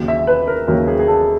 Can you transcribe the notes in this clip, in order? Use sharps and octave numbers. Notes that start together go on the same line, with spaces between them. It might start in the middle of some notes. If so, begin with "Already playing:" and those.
Already playing: D#2 C#3 F#3
E5
B4
A#4
D#2 C#3 F#3 A#4
G#4
G#4
A4